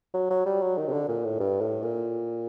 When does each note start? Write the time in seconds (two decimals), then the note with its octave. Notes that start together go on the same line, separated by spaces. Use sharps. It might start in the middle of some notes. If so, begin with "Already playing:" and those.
0.14 F#3
0.30 F#3
0.46 G3
0.61 F#3
0.78 D#3
0.88 C3
0.93 D3
1.08 A#2
1.24 A2
1.40 G2
1.61 A2
1.82 A#2